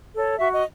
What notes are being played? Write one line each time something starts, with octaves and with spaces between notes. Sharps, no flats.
A4 C#5
F#4 E5
D#5